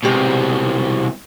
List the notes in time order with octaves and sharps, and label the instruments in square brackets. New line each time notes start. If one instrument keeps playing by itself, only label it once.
[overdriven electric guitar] C2 B2 [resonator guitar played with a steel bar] G#3 G4 C5